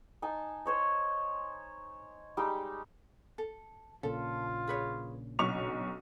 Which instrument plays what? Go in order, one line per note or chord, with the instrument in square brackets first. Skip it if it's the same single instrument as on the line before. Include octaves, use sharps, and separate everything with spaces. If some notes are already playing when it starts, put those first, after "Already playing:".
[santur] D#4 G#5 A5
C5 C#5 D#5
G3 G#3 D#4 G4
[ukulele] A4
[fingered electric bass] A#1 A#2 C#3 [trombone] F4 [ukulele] A4
[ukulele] G#4 B4 C#5
[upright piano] B1 C#6 F7 [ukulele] C#4 D4 F#4